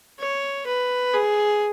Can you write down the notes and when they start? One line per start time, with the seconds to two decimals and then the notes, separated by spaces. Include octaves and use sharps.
0.19 C#5
0.67 B4
1.14 G#4